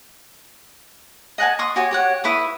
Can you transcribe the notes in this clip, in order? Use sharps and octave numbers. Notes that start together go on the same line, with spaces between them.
D#5 F#5 G#5 A5
C6 C#6 D#6
F#4 G4 C#5 G#5
G4 C#5 F#5
E4 B4 C#6 D#6